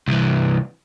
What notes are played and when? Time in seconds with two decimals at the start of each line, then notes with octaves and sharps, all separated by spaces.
0.08 C2 E3